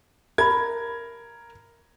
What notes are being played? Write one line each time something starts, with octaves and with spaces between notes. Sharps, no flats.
A#4 E5 A5 B5 G#6